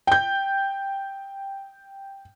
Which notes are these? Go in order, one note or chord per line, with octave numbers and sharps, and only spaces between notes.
G5 G6